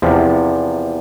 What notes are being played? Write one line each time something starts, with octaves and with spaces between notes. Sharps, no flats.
E2 C3 F3